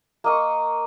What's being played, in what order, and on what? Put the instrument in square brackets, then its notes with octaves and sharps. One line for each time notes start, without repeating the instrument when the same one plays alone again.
[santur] A#3 D#5 C#6